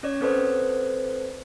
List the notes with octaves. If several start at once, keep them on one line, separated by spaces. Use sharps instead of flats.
C#4 C#5 D5
C4 A4 B4 C5 D5